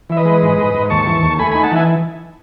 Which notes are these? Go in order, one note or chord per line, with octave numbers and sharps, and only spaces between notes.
E3 E5
B4 D#5
G#3
G#2
G#2
G#2
D#2 A5 C#6
E3
D#2
A3 G#5 B5
D#4 G#5 B5
F#5 A5
E3 E5 G#5